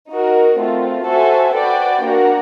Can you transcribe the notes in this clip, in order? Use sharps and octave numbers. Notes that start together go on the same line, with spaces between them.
D#4 F#4 A#4
A3 C4 F4
F#4 A4 C5 E5 G#5
F#4 B4 D5 G5
A#3 D4 F#4 A#4